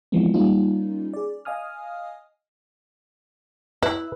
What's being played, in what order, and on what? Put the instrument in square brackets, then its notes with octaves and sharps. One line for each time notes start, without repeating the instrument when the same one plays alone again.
[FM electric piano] E3 F3 G#3 B3 C4
G3 A#3 C#4 D#4 F4
G#4 D5
D#5 F5 G#5 D#6 F6
[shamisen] E4 [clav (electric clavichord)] B4